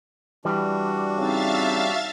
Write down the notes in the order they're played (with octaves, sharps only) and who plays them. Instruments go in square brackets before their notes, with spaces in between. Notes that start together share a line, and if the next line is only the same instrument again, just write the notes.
[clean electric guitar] E3 G3 [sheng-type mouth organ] D4 F#4
[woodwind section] C#3 C4 D#4 [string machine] E5 F5 A6